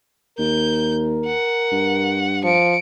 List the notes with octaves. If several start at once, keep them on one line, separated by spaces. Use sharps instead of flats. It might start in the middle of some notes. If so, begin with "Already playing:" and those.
D#2 A#4 G6
F#5
G2
F3 C#7 D7